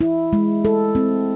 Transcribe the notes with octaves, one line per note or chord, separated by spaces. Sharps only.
E4
G#3
A4
C4